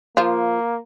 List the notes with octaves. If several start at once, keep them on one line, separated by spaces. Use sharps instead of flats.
F3 A#3 F4